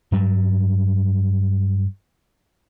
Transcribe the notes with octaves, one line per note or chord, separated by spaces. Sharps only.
G2 F#3 G3